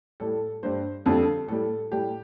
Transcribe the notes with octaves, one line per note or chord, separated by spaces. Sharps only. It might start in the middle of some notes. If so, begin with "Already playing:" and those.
A2 G3 A4
G2 G3 C5
F2 D3 G3 A4
A2 G3 A4
A2 G3 G4